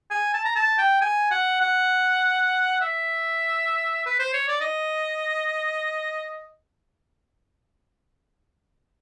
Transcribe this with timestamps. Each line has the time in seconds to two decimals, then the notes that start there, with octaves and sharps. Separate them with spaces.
0.11 G#5
0.34 A5
0.45 A#5
0.56 A5
0.79 G5
1.01 G#5
1.31 F#5
1.61 F#5
2.81 E5
4.06 B4
4.19 C5
4.34 C#5
4.48 D5
4.61 D#5